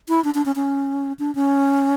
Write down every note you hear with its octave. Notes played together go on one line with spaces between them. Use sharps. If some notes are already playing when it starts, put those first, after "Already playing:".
E4
D4
D4
C#4
C#4
D4
C#4